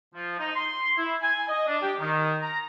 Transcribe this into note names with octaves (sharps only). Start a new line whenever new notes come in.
F3
D#4
C6
E4
G#5
D#5
D4
G4
D#3
A#5